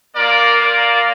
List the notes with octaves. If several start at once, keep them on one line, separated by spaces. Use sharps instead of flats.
A#3 F4 A#4 D5
A#4 D5